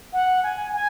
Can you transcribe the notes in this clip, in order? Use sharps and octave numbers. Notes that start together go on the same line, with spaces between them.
F#5
G#5
G#5